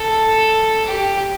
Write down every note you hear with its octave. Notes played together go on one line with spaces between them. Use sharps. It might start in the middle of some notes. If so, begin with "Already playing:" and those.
Already playing: A4
G4